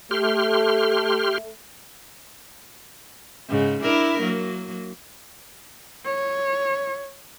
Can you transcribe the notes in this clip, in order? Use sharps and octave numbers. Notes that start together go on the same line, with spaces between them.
A3 G4 C6 F6
G#2 C#3
D4 E4 A#4
F#3 A#3
C#5